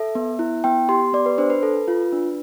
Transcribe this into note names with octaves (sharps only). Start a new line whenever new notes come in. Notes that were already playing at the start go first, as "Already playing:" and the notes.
Already playing: A4 E5
B3
E4
B3 G5
G4 C6
B3 D5
B4
D4 C5
B4
A4
F4
D4